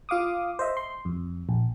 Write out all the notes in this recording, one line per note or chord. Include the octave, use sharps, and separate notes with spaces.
F4 F5 D6 D#6
C5 D#5 E5
C6
F2
A#1